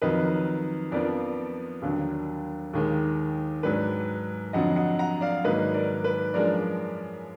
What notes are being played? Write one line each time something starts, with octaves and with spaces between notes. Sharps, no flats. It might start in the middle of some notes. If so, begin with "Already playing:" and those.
F2 D#3 F#3 B4 D#5
F2 F3 B3 D4 A#4 D5
D#2 D3 F#3
D#2 D#3 G#3
G#2 F#3 D4 B4
F2 D3 F#3 D#5 F#5
D#5 F#5
F#5 A#5
D5 F5
G#2 D#3 F#3 A#3 B4 D#5
A#4 D5
B4
F#2 F3 G#3 D4 A#4 D5